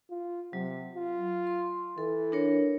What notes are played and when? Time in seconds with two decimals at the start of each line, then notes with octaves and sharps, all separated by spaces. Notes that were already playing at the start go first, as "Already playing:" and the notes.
0.10 F4
0.53 C3 F#3
0.95 F4
1.47 C6
1.98 E3 A4
2.32 D4 A#4 C#5